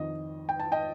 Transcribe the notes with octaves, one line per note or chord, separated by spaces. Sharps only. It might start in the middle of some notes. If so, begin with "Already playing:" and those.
Already playing: F2 D#3 D#5
G5
A5
D#5 G5